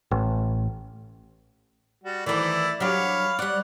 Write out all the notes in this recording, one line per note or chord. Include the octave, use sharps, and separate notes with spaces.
A1
G3 F#4
D#3 E3 A3 E4 D5
F#3 D4 G4 C#5 F5 B5
G3 D5 F#5